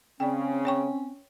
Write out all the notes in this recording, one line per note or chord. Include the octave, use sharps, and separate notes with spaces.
C#3 C4 C#4 D5 G5
C#5 G5 C#6